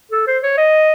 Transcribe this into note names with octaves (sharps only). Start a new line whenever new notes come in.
A4
C5
C#5
D#5